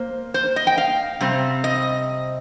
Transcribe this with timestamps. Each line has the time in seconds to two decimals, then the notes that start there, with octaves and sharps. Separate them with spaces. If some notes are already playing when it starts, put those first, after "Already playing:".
Already playing: A#3 C5
0.34 C5
0.56 D#5
0.67 G5
0.78 F5
1.21 C3 G3 C4
1.64 D#5